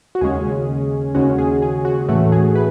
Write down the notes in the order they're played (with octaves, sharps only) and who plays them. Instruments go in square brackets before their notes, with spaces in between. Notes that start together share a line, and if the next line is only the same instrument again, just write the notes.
[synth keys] F#4
D#2 C#3 G#3 C#4 G#4
D#2 C#3 G#3 C#4 F#4
G#4
G#4
F#4
A2 E3 A3 C#4 F#4
G#4
B4